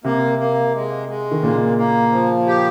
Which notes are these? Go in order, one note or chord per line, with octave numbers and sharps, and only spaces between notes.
C3 A#3
A#3
G#3
G#3
D#3
A#2 C#3 A#3
A#3
F3
G4